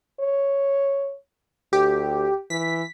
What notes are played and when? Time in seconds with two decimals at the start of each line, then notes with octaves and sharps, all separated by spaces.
0.20 C#5
1.73 D2 G4
2.50 E3 B6